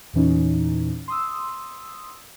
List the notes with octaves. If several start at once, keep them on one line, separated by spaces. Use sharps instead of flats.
E2 A#2 E3 C#4 D#4
C6 D#6 E6